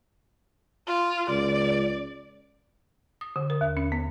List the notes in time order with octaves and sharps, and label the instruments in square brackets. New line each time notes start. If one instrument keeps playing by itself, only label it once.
[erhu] F4
[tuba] C#2 [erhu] D5
[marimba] D#6
D3
A#4
D#2
C#4
B3